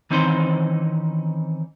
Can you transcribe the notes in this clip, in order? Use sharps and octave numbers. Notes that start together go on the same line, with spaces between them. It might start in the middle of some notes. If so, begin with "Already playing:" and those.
D#3 E3 C4 C#4 D#4 C5